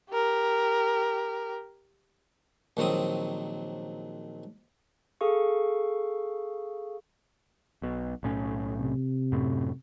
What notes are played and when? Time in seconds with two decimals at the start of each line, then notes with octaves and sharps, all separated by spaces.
0.10 G4 A#4
2.77 A#1 D#3 F#3 C4 D#6
5.21 G#4 A4 F5 C#6
7.82 B1 B2
8.23 B1 A2 C#4
8.80 C3
9.32 F#2 A2